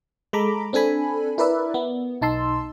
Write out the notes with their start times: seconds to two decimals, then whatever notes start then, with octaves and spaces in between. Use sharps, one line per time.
0.33 G#3 A4 A#5 B5 D6
0.73 C4 D4 A4 G#5 B5
1.38 E4 A#4 B4 D5 E5
1.74 B3
2.22 B1 D#4 A5 C6 E6